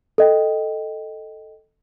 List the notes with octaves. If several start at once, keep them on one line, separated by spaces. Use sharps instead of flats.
A4 D#5 G5